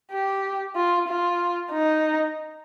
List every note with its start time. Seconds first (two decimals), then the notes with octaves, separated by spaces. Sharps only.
0.12 G4
0.76 F4
1.08 F4
1.72 D#4